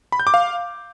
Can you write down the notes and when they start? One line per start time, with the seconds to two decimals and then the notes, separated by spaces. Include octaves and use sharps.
0.12 B5
0.20 G6
0.27 D6
0.34 F5